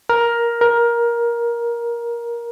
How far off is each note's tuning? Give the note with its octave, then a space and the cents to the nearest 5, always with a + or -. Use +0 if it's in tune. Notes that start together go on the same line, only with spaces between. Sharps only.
A#4 +10
A#4 +15